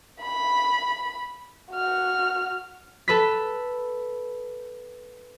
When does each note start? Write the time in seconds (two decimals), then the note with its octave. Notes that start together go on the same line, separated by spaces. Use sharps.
0.21 B5
1.72 F#4 F6
3.08 A4 B4 B6